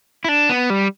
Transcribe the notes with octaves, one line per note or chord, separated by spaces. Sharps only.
E4
D4
B3
G3